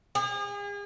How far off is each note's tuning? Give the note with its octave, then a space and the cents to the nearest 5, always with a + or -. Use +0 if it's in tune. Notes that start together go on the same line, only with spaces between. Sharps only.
G#4 -40